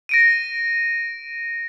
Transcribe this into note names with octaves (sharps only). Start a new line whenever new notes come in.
A#6 D7 D#7